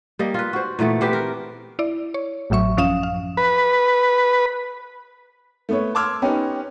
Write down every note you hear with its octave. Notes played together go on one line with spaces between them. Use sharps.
G3 A#3 D#5
F4 B4
F#4 C5
A#2 E3 A3 B3
C4 G4 B4
A#4
E4 D5
C#5
A1 A2 F#3 E5 C#6
F#2 F3 C#4 F5 D#6 E7
F5
B4
A3 B3 C#5
A5 C6 D6 E6 F6 G#6
B3 C#4 D#4 G4